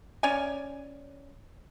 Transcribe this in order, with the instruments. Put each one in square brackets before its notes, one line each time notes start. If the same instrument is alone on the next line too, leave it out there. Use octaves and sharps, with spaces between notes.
[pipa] C#4 C#5 D5 G#5